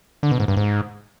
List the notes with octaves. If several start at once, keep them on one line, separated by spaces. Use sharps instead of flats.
D3
B2
G#2
G2
G#2